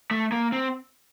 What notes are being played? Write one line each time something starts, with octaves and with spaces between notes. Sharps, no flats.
A3
A#3
C4